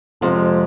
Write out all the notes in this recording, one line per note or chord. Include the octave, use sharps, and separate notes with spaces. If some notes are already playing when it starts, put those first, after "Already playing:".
F2 C3 F3 G#3 C4